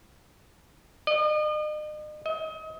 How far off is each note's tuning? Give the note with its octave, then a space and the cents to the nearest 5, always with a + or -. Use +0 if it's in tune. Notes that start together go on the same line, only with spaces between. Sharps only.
D#5 -40
D#5 +35